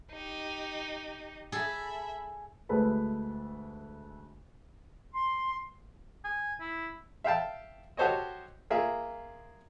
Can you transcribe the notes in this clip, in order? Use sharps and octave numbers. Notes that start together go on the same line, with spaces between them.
D#4 G4
G#4 A4 E5 B5
D2 G#3 A3 A4 B4 B5
C6
G#5
E4
E5 F5 G5 A5
F#4 G4 A4 C5 C#5 D#5
A#3 F4 G#4 E5